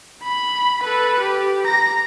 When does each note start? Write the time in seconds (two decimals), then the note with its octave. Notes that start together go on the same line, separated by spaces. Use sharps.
0.23 B5
0.83 A4 B4
1.20 G4
1.65 A#5 A#6